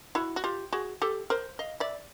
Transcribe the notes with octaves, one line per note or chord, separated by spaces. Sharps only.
E4 F#4
F#4
F4 G4
F#4 G#4
G4 A4
A#4 C5
D#5 F5
D5 E5